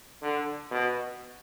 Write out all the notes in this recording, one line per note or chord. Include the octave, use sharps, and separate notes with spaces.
D3
B2